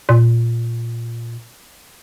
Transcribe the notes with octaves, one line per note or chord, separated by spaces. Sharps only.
A#2